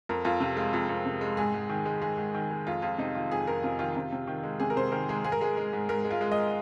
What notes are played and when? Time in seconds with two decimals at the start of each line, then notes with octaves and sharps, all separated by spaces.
0.09 F2 A#4
0.25 F2 F4
0.40 C3 F4
0.57 G#3 F4
0.73 F2
0.89 F2
1.06 C3
1.21 G#3
1.37 G#2 G#4
1.54 G#2
1.69 D#3
1.85 G#3
2.02 G#2 G#4
2.18 G#2
2.35 D#3
2.51 G#3
2.67 F2 F4
2.82 F2 F4
2.98 C3 D#4
3.15 D#3 F4
3.31 F2 G#4
3.47 F2 A#4
3.63 C3 F4
3.79 D#3 F4
3.95 C3 F4
4.12 C3
4.27 D#3
4.43 G#3
4.60 C3 G#4
4.70 A#4
4.76 C3 C5
4.92 D#3 A#4
5.09 G#3 G#4
5.24 G#2 G#4
5.32 A#4
5.41 G#3 G#4
5.57 G#3
5.73 G#2
5.89 G#2 A#4
6.05 G#3
6.11 F4
6.21 G#3
6.32 D#5